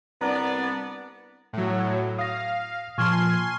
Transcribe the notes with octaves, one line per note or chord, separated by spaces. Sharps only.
C2 B3 D4 D5 A#5
A2 F#3
F5 D#6 A#6
A#2 F3 G#5 A5 C6 C#6 F6